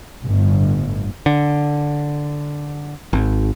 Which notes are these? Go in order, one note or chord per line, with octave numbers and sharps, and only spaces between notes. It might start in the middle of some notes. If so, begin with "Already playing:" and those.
G1 A2
D3
G#1